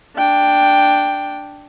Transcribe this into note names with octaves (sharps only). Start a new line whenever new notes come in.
D4 G5